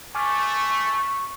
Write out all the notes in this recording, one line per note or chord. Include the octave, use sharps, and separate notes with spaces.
A3 G#5 C#6 D6 F6